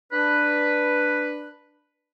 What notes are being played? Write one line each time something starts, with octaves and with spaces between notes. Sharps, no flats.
D4 B4